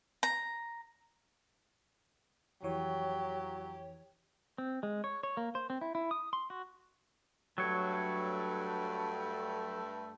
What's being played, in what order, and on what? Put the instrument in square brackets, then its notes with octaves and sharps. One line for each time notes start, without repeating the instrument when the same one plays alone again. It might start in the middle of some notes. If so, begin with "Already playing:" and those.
[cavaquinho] A#5
[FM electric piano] F2 E3 C#5 [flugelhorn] F#3 [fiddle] G4
[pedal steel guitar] C4
G#3
C#5
C#5
A#3
C5
C4
E4
E4
D#6
C6
F#4
[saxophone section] G2 A3 [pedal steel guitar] F#3 C#5